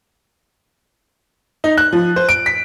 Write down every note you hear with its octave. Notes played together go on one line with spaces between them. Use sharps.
D#4
F#6
F3
C5
D7
B6